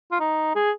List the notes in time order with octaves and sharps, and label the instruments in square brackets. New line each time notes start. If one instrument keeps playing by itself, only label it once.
[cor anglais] F4
D#4
G#4